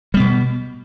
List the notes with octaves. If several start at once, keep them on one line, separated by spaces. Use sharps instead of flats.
B2 G3 B3